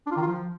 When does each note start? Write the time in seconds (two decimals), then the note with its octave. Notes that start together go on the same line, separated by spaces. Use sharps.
0.06 D4
0.11 F4
0.16 D#3
0.22 F4
0.27 F3